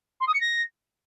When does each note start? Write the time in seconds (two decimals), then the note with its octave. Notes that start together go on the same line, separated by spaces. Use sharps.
0.20 C6
0.27 D#6
0.34 C#7
0.40 A#6